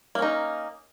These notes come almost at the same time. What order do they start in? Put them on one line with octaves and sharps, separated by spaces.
A#3 C#4 D#4